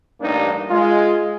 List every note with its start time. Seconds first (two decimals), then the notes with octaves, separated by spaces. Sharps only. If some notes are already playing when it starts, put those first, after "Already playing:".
0.21 A1 G2 G3 A#3 D4 D#4
0.70 G#3 F4 G#4